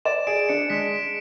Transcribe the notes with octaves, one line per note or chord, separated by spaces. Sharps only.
D5 E7
G#4 D7
D4 C#7
C#7
G#3 B6